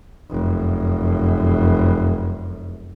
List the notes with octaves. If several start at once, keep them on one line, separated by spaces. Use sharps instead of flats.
F1 F#2